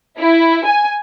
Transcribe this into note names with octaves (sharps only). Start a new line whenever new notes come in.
E4
G#5